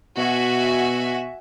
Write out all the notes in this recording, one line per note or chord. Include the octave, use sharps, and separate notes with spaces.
B2 F#4 E5 G#5